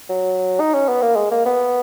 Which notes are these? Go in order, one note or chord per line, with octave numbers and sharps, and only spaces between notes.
F#3
D#4
C#4
B3
A#3
G#3
A#3
B3